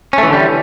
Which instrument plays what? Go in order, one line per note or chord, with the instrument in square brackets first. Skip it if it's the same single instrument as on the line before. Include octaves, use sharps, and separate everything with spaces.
[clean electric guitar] C#4
A3
E3
D3
G3